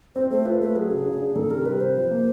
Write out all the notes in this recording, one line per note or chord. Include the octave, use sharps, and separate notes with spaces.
C4 C5
A3 C5
F4 B4
A3 B4
F#3 G#4
C#3
C#3
D4
D#3 A4
C3 A#4
G3 B4
C3 C5
F3
A#3